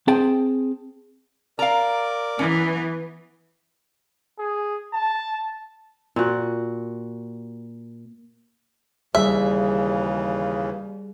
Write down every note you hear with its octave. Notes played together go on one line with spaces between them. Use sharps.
C4 G#4 G5 A5
A#4 D5 F5 A#5 D6
E3 B3 C#4
G#4
A5
A#2 F#4
D#2 C#3 E3 G3 G#4 E5